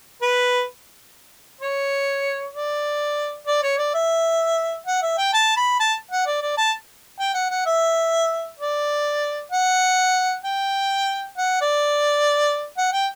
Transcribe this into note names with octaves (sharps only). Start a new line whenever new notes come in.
B4
C#5
D5
D5
C#5
D5
E5
F#5
E5
G5
A5
B5
A5
F#5
D5
D5
A5
G5
F#5
F#5
E5
D5
F#5
G5
F#5
D5
F#5
G5